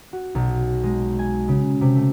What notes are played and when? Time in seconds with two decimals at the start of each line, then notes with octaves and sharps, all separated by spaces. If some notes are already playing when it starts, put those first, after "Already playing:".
0.13 F#4
0.35 B1
0.83 G#3
1.19 G#5
1.48 C#3
1.81 C3
1.96 A3